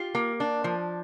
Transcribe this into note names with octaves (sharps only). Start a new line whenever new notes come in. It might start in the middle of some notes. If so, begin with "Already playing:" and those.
Already playing: F4 G4
A#3
D4
F3